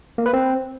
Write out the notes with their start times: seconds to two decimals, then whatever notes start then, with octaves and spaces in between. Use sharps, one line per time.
0.18 A#3
0.26 B4
0.33 C4